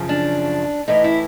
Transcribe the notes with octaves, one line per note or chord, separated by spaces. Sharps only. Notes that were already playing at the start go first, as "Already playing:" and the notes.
Already playing: F#2 C#3 F3
D4
A2 E3 D#4
E4